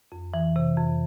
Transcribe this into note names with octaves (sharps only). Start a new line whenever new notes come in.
F2
E3
C3
F2